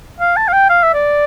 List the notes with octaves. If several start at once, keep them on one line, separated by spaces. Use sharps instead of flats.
F5
A5
F5
G5
F5
E5
D5